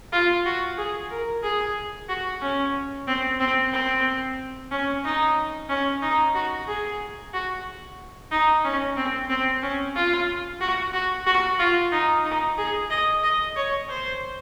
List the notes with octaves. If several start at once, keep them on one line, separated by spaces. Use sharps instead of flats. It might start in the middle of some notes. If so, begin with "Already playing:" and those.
F4
F#4
G#4
A#4
G#4
F#4
C#4
C4
C4
C4
C#4
D#4
C#4
D#4
F#4
G#4
F#4
D#4
C#4
C4
C4
C#4
F4
F#4
F#4
F#4
F4
D#4
D#4
G#4
D#5
D#5
C#5
C5